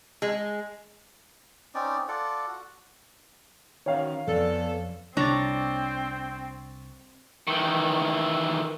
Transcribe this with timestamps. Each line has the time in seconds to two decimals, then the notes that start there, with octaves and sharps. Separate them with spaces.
0.22 G#3
1.75 C4 C#4 D#4 D5
2.08 F4 A4 D5 F#5
2.48 F#4
3.86 D#3 C#4 F#4 C#5 F5
4.28 F2 B3 A4 D5
5.17 C2 C4 D4 C#5 A#5 C#6 A6
7.47 D#3 E3